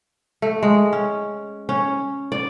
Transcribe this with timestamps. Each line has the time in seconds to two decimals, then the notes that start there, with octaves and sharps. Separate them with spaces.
0.42 A3
0.63 G#3
0.93 C#4
1.69 C#4
2.32 D5